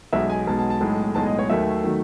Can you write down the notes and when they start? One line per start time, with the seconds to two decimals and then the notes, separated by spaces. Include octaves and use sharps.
0.13 B1 B2 G#3 E5
0.30 G#5
0.47 B1 B2 G#3 A5
0.59 A5
0.70 A5
0.81 B1 A2 G#3
1.15 B1 A2 G#3 A5
1.26 D#5
1.39 C#5
1.50 D#2 D#3 F#3 A3 E5
1.84 D#3 F#3 A3